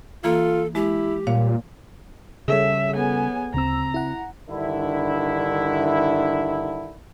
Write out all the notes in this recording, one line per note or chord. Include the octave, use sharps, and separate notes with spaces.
E3 A#3 F4 A4
G#3 E4 G4
A#2 G3 C#5 F5
C#3 G3 G#4 A4 C#5 E5
B3 G#5
D2 C#3 C4 A#5 E6
E4 F#5
G2 D3 D#3 E4